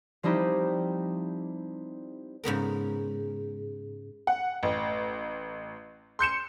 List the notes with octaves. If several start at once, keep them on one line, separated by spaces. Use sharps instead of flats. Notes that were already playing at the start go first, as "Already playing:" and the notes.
F3 G3 C4 D#4 E4 G4
G#2 C#3 B3 A#4
F#5
A1
C6 G6 C#7 E7